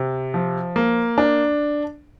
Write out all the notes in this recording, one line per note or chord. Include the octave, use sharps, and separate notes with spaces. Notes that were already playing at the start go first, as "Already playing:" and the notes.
Already playing: C3
F3
A#3
D4